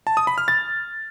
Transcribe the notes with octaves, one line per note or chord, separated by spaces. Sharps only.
A5
D#6
B5
F6
A6